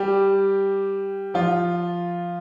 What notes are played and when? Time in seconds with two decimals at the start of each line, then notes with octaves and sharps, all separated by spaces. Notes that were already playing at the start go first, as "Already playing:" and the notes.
Already playing: G3 G4
1.34 F3 F4